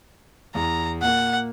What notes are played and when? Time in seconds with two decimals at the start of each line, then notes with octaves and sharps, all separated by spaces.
0.55 E2 A#5
1.02 A#2 A#3 F#5